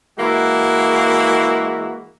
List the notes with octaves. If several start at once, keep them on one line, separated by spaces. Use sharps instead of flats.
E3 G#3 A#3 E4 F#4